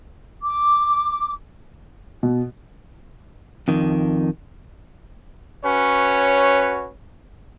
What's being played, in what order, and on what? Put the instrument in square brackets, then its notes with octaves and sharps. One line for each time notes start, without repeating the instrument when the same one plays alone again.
[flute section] D6
[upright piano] B2
[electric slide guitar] F2 D#3
[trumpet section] C#4 F#4 B4 C#5